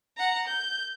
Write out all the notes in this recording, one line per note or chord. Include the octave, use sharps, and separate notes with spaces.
F#5 A#5
G6